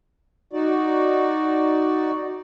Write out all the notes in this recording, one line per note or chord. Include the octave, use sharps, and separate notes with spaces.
D#4 F#4 D5